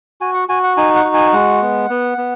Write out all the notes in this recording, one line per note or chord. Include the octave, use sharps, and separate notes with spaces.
F#4 G#5
F#5
F#4 G#5
F#5
D#4 G#5
F#5
F#4
G#5
G#3 F#5
B3
B3
B3